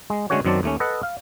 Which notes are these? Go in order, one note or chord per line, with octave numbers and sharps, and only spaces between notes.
G#3
D3 G#3 A3 C#4 F#4 C#5
F#2 D#3 F#3 C4 D5 A5
D#2 A3 C#4
A4 B4 D#5 F#5
F5